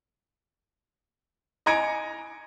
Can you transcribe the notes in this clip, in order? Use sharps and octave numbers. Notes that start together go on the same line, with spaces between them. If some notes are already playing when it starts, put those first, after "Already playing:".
D#5 G#5 A#5 G#6 C#7 D7